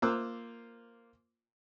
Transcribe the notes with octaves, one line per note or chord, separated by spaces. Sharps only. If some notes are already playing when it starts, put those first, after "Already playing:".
A#3 F4 C5 D6 E6 F#6